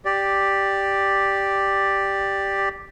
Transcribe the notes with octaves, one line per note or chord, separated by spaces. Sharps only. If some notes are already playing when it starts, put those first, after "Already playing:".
G4 D5